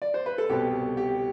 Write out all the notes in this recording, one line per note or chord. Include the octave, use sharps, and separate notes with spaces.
D5
C5
B4
A4
C2 B2 G4
G4